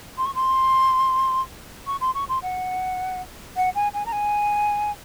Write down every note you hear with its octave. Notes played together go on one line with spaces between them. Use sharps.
C6
C#6
C6
C#6
C6
C#6
C6
F#5
F#5
G#5
G#5
A#5
G#5